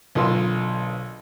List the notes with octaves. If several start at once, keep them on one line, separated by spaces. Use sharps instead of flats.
B1 D3 F4 A#4 C6 E6